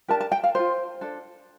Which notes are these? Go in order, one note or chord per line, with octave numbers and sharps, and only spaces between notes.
D4 G4 A#4 A5
A5
G5
F5
F4 A#4 C5
D4 A4